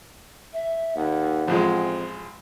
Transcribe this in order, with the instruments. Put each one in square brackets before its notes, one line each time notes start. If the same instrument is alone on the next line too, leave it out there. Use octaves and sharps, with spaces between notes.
[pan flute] E5
[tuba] D#2 [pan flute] F#5
[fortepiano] A1 F3 G#3 [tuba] F2